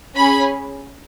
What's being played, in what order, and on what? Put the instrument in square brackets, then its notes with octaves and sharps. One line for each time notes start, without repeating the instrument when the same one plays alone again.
[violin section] C#4 G#4 B5